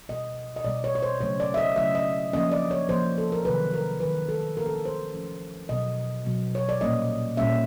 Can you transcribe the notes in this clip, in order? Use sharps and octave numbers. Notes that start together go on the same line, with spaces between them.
B2 G3 B3 D#5
D#5
B2 G3 B3 D5
C#5
C#5
C5
C#3 F#3 A3 C#5
D5
E5
D#5
C#3 F#3 A3 E5
D#5
F3 A#3 C#4 D#5
D5
C#5
F3 A#3 C#4 C5
A4
A#4
C3 D#3 F#3 B4
A#4
C3 D#3 F#3 B4
A4
F3 A3 C#4 A#4
A4
A#4
C5
F3 A3 C#4
B2 F#3 B3 D#5
B2 F#3 B3
C#5
D5
A#2 G3 A#3 C#4 D#5
A#2 G3 A#3 C#4 E5